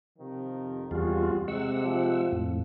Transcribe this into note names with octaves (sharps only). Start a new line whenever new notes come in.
C3 D#3 F3
F2
E2 G3 F4 F#4 G#4
C3 G#3 F#5 E6
F3
F2 A2